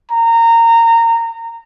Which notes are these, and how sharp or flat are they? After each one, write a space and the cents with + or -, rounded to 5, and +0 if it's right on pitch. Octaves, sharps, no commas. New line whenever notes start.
A#5 -20